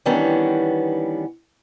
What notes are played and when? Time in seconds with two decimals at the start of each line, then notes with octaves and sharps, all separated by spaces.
0.06 D#3 E3 G3 B3 C#4 D4